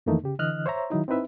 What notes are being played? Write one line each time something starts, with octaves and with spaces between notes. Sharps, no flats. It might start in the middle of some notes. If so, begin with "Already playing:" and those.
F2 D#3 E3 A3 A#3 D#4
C#3 G4
D3 E3 D#5 F6 F#6
C5 C#5 E5 A#5
D#3 F#3 D#4 E4
C4 D#4 E4 B4 E5